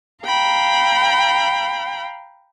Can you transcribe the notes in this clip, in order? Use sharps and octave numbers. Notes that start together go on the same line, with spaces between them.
F5 G5 A#5 B5